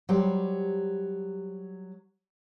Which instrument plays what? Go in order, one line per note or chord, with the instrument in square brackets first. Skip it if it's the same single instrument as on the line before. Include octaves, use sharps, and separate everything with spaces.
[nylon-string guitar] F#3 G3 G4 C5